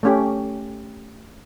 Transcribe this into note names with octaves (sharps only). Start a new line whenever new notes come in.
A3 C#4 G4